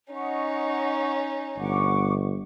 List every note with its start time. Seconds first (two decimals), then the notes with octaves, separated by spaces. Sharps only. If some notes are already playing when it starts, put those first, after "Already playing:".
0.13 C#4 D#4 D#5 F#5 C#6
1.59 G1 F#5 C#6 D6